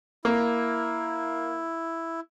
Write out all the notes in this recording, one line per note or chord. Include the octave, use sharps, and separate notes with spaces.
A#3 E4